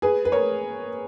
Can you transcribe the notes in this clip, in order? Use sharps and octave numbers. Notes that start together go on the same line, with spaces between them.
G#4 B4
B4
A#4 C#5